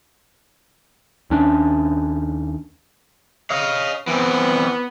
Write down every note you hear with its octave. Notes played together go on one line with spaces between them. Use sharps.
D#2 C#4 D4
C#5 D#5 F5
E3 B3 C4